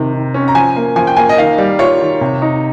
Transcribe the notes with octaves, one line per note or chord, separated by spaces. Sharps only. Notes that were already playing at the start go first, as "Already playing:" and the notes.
Already playing: C3 D#3
D#3
C#4
A#5
F3 G#5
A#3
F3 G#5
G5
A#3 G#5
D#5
D#3 F5
G3
F4 C#5
D#3
C3
D#4